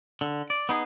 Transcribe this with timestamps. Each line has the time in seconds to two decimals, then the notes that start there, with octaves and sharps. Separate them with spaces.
0.21 D3
0.50 D5
0.69 B3 D#4 G#4